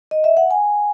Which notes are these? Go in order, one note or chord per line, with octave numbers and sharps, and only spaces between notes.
D#5
E5
F#5
G#5